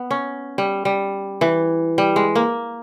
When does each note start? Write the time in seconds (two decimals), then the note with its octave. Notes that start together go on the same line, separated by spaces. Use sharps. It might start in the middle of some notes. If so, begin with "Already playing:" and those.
Already playing: B3
0.11 C#4
0.58 G3
0.85 G3
1.41 E3
1.98 G3
2.16 G#3
2.35 A#3